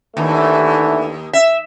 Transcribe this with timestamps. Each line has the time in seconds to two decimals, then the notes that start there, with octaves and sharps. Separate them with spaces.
0.17 D#2 D3 E3 A3
1.33 E5